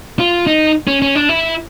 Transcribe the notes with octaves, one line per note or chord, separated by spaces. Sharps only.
F4
D#4
C#4
C#4
D4
E4